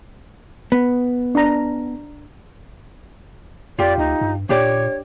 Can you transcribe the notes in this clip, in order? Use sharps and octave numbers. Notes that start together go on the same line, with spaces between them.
B3
D4 A#5
F2 F4 G4 D5
D2 D#4
G2
A#2 D4 G4 C#5 D5